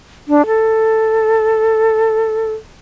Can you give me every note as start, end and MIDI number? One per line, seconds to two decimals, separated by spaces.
0.28 0.46 62
0.47 2.52 69